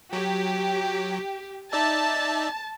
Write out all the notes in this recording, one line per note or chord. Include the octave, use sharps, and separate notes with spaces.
F#3 G4
D#4 D5 E5 A5